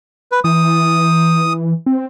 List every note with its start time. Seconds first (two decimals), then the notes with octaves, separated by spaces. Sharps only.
0.32 B4
0.44 E3 D#6
1.86 C4